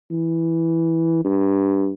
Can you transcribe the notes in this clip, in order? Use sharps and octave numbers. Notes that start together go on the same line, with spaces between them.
E3
G2